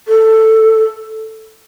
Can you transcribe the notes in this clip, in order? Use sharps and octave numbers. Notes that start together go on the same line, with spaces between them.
A4